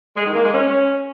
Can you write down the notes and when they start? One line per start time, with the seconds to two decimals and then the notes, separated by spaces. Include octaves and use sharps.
0.16 G#3
0.25 D#3
0.34 A#3
0.44 G#3
0.53 C#4